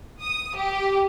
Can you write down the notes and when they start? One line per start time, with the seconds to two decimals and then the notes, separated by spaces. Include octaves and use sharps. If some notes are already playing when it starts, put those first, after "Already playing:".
0.21 D#6
0.57 G4